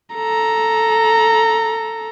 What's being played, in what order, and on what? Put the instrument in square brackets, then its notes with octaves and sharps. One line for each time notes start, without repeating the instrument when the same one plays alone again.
[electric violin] A4 A#5